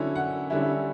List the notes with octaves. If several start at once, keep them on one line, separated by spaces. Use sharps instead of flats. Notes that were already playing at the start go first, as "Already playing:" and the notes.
Already playing: D3 F#3 C#4 E4
F#5
D3 G3 C#4 E4